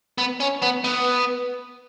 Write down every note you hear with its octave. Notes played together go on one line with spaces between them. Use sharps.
B3
C#4
B3
B3